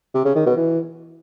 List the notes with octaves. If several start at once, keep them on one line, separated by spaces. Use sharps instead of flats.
C3
C#3
D#3
B2
E3